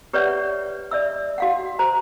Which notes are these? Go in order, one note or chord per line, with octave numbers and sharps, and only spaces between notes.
G4 B4 C#5 D5 E5 F#5
D5 E5 E6
F#4 F5 F#5
F#4 C5 A#5